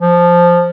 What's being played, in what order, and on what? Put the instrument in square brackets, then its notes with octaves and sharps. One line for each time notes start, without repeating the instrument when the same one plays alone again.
[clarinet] F3